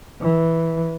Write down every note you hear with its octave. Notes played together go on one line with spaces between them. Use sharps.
E3